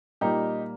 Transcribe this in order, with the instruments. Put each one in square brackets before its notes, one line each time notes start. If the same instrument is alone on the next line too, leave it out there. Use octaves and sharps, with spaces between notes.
[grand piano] A#2 G3 A#3 D#4 G4